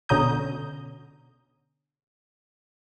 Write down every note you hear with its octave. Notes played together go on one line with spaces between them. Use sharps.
B2 D3 C#4 A#5 D#6 G6